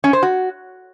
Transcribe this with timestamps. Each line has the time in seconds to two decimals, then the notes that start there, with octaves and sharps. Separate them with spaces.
0.04 C#4
0.13 C5
0.23 F#4